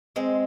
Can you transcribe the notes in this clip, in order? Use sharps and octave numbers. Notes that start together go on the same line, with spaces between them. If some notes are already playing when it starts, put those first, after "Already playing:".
G#3 C4